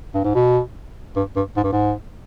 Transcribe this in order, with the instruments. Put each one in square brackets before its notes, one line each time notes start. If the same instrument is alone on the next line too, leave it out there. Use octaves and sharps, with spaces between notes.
[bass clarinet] G2
G#2
B2
G2
G2
G#2
G2
G#2